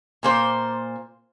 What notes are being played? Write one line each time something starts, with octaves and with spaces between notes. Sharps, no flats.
A#2 A#3 C5